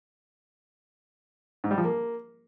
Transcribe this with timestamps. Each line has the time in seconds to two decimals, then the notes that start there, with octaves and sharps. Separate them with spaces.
1.64 G#2
1.71 G3
1.78 F3
1.85 A#3